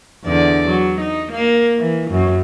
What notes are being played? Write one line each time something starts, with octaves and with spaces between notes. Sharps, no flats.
E2 D3 D5
F#3
D#4
A#3
E3
F#2